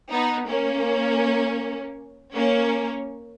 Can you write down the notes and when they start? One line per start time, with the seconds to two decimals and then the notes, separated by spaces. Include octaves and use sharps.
0.11 B3 D#4
0.48 A#3 C#4
2.35 A#3 C#4